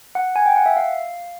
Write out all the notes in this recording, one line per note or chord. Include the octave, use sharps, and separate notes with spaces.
F#5
G#5
G5
F#5
E5
F5